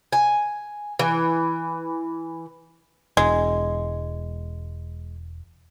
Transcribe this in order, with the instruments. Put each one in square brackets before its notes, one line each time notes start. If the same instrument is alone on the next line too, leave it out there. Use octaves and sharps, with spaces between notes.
[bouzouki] G#5
E3
[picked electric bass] E1 [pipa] G#3